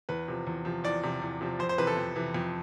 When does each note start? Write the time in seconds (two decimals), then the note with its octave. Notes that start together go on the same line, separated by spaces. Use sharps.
0.09 E2 B4
0.28 C3 F3
0.47 E2
0.65 C3 F3
0.84 E2 D5
1.03 C3 F3
1.22 E2
1.41 C3 F3
1.59 F2 C5
1.69 C5
1.78 C3 E3 B4
1.87 A4
1.97 F2
2.16 C3 E3
2.34 F2